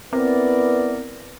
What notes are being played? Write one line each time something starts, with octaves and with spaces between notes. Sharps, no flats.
B3 C4 E4 A#4 B4 D5